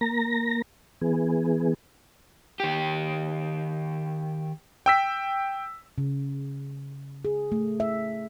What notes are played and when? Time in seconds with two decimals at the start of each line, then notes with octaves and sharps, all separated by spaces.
0.01 A#3 A#5 A#6
1.01 E3 B3 G#4
2.60 D#3 G4
4.86 G5 E6 B6
5.98 C#3
7.25 G#4
7.52 A3
7.80 E5